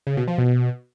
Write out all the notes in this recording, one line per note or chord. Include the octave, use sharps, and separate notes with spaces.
C#3
B2
F3
B2